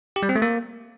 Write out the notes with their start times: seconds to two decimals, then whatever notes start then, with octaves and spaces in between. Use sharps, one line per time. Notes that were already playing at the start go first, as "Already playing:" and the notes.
0.16 G4
0.23 G3
0.29 C4
0.36 A3
0.42 A#3